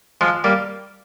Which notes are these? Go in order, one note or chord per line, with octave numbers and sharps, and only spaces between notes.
F3 G#3
G3 A#3